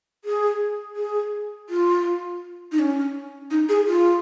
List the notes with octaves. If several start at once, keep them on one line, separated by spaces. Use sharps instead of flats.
G#4
G#4
F4
D#4
C#4
D#4
G#4
F4